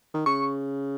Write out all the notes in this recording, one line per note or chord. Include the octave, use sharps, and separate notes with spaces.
D#3
C#3 C#6